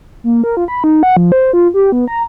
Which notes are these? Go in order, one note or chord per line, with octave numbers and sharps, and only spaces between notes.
A#3
A#4
F4
B5
D#4
F#5
F3
C5
F4
G4
B3
A#5